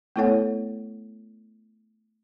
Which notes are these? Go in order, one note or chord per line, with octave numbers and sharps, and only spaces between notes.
A3 B3 E4 A4 C#5 F#5